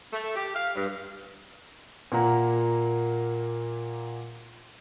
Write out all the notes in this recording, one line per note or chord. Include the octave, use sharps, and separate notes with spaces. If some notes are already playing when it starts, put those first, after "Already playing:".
A3
G4
F5
G2
A#2 A#3 F#5 A#5